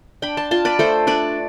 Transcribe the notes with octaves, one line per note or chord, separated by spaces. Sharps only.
D4 G5 B5
A5 C6
F4 A5 C6
B4 D5
A3 A4 C5
D4 B4 D5